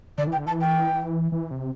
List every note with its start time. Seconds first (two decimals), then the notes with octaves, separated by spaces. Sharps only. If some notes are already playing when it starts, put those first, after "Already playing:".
0.18 D3 D5
0.27 E3
0.32 G5
0.37 D3
0.46 E3 A5
0.61 G5
1.32 E3
1.51 C3